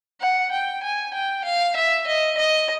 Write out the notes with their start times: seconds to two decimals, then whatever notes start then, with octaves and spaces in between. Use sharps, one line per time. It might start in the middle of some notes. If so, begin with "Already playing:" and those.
0.20 F#5
0.51 G5
0.83 G#5
1.14 G5
1.45 F5
1.76 E5
2.07 D#5
2.38 D#5